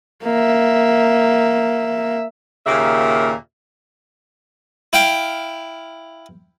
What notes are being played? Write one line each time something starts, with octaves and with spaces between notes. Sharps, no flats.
A#3 E5
D#2 A#2 C#3 A#3 G4 E5
E4 F5 G5